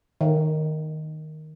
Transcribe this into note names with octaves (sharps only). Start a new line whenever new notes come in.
D#3